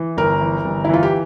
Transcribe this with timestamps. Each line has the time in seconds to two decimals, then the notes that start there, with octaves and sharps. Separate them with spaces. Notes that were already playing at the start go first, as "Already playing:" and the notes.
Already playing: E3
0.17 G1 A#4
0.41 E3
0.65 G1
0.84 E4
0.89 E3 F4
1.03 G4